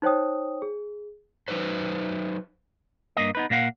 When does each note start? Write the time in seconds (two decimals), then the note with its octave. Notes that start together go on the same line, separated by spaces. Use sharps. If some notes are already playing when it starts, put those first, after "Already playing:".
0.02 D#4 C5 C#5 G5 D#6
0.62 G#4
1.48 F#3 D#4 B4 C5
3.17 G2 A#3 D#5
3.35 B3 D#4 B4
3.50 A#2 A#3 F5 F#5